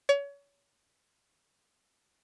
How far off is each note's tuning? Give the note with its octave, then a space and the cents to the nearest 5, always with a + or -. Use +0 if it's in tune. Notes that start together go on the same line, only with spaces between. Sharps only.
C#5 +30